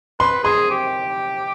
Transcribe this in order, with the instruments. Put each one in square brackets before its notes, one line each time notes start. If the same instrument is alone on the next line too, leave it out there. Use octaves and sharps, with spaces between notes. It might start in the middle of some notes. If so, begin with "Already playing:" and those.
[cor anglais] B4 [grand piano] C6
[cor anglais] G#4 [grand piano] C6
[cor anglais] G4